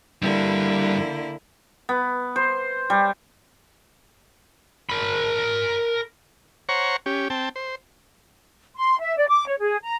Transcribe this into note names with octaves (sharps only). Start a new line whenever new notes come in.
G2 D3 G3 A#3 E4
B3
C5
G3
A#4 B5
C5 C#5 F#5 A#5 C#6
C#4 G4
C4 G5 A5
C5
C6
E5
D5
D6
C#5
G#4
A#5